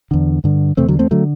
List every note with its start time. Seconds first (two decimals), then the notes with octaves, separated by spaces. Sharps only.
0.11 E2 D3
0.44 G2 D3
0.77 E2 C3 A3 C4
0.88 D3 F#3
0.99 A3 C4
1.11 D3 F#3 A3